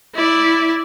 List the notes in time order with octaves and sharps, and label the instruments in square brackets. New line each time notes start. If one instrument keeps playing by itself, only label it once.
[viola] E4 D5